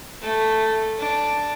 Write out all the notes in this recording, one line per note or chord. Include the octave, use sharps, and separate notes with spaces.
A3
D4